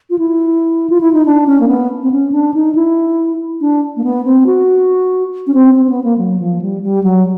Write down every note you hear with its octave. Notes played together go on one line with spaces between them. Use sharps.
F4
E4
F4
E4
D#4
D4
C#4
A#3
B3
C4
C#4
D4
D#4
E4
D4
A#3
B3
C4
F#4
C#4
C4
C4
C4
B3
A#3
F#3
F3
G3
G3
F#3